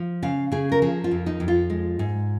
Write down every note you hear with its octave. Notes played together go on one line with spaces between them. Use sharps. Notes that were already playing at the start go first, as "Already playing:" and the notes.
Already playing: F3
C#3 F5
C#3 G#4
A#4
F3 G#4
F4
F2
D#4
F2
F4
G#3
G#2